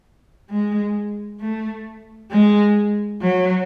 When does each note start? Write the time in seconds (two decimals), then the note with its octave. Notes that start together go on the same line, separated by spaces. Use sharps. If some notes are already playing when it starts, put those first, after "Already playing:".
0.50 G#3
1.40 A3
2.31 G#3
3.21 F#3